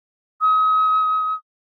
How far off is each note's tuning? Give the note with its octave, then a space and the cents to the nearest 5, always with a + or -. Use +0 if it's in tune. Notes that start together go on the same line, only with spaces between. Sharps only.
D#6 +35